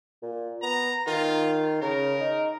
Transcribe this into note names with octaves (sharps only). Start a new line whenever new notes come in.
A#2
B3 A#5
D#3 F4
C#3 A#4
D#4